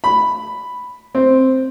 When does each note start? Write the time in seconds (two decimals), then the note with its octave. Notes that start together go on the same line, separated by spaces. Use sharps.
0.04 B5
1.15 C4